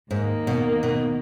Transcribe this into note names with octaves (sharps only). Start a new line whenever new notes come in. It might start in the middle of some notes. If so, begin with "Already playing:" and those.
D#2 G#2 D#3 A#3
B2
B2